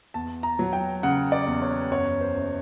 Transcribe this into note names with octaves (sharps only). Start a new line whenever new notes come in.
E2 A5
A#5
F#3
G5
C#3 F#5
D5
E2
C#5
F#2 C#5
C5
F#1